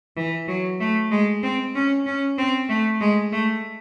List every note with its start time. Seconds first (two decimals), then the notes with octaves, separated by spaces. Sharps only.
0.17 E3
0.48 F#3
0.80 A3
1.11 G#3
1.43 C4
1.75 C#4
2.06 C#4
2.38 C4
2.69 A3
3.01 G#3
3.32 A3